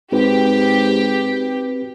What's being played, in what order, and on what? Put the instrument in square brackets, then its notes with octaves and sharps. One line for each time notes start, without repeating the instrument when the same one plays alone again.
[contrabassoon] G#2 [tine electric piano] C4 F#4 B4 [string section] G4